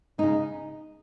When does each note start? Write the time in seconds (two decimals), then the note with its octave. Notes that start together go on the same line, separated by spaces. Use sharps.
0.18 C#3 G#3 D#4